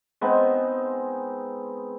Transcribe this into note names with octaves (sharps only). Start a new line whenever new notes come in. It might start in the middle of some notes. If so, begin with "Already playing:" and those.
G#3 B3 C4 D#4